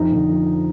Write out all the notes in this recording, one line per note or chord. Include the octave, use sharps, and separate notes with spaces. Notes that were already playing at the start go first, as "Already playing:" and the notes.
Already playing: F2 D#4
D3
F3